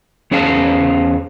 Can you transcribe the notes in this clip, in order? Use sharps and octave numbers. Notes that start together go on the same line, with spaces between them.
E2 C#4 G#4 C5 F5 A5